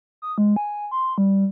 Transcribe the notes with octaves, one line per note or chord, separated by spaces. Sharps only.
D#6
G#3
G#5
C6
G3